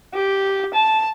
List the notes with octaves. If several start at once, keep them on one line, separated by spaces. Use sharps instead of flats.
G4
A5